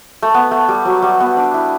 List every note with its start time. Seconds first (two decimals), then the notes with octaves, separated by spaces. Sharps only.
0.22 A3
0.34 B3
0.51 A3
0.69 G3
0.85 F#3
1.02 G3
1.20 B3
1.37 D4
1.54 E4